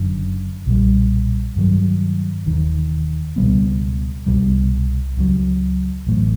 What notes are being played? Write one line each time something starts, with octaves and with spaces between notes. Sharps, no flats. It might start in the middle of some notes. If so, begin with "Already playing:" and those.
Already playing: F#1 F#2 D3
B1 A#2 G3
G2 D#3 F#3
E1 D#2 D#3
C#2 B2 G3 B3
C2 B2 G3
C#2 C#3 F#3
A1 A2 F#3 A3